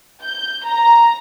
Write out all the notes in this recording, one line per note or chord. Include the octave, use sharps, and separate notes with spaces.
G6
A#5